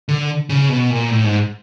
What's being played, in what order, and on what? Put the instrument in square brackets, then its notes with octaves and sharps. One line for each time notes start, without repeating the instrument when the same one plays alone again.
[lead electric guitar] D3
C#3
B2
A#2
A2
G#2